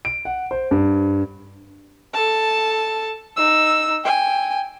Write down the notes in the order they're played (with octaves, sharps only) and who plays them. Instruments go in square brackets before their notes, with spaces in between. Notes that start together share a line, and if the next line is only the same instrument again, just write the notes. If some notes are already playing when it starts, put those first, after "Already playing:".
[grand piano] D7
F#5
C5
G2
[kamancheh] A4 A5
D#4 E6
G5 G#5